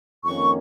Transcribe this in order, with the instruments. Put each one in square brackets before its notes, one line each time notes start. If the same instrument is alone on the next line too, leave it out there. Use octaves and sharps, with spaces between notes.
[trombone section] F2 D#3 A#3 C#4 [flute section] C#6